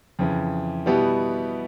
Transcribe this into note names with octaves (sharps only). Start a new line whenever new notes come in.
F2 C#3 E3
B2 G3 B3 E4 G4